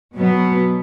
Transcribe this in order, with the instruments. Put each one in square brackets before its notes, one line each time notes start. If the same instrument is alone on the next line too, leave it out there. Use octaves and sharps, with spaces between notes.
[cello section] B2 F#3 B3